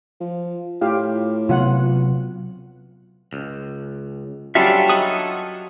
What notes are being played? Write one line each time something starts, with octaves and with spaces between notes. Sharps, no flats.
F3
A2 F4 G4 F5
C3 F#3 B3 F4 F#5
C#2
F#3 G3 C#4 D4 F4 A4 E5
D#5 F#5 G#5 D#6